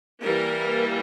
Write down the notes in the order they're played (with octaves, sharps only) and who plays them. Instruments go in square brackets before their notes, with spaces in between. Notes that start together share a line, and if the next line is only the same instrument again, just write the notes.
[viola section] E3 G3 A#3 A#4